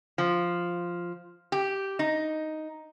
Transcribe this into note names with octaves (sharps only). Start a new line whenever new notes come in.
F3
G4
D#4